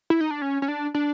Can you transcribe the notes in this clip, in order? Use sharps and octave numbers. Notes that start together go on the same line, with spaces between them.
E4
D#4
D4
C#4
C#4
D4
D4